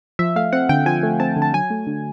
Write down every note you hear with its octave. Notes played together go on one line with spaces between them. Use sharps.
F3 E5
A3 F5
C4 F#5
D3 G5
F3 G#5
A3
C4 A5
D3
A5
F#3 G#5
A3
D3